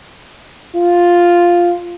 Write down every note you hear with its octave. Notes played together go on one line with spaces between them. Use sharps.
F4